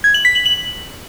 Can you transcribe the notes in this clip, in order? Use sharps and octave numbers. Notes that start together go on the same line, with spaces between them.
G#6
F#7
B6
F#7
F#7